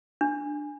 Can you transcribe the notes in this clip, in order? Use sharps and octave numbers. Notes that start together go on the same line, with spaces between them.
D4